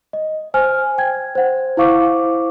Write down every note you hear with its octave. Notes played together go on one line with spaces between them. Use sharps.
D#5
C5 G#5 F6
G5 G#6
C5 F#5
E4 C5 F5 C#6 D6